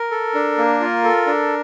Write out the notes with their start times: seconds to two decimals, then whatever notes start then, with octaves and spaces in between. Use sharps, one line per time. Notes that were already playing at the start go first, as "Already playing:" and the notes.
Already playing: A#4
0.11 A4
0.34 D4
0.58 A#3
0.80 F4
1.04 A4
1.27 D4